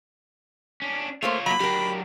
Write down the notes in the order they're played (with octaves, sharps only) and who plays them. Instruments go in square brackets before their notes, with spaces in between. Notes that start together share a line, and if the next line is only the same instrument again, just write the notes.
[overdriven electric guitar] C#4 D4
[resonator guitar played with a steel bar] A3 A#3 C5 [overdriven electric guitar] F4 C#5
[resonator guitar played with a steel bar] F#3 A#3 [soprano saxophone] B5
[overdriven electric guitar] F#3 D4 [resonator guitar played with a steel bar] G4 A#4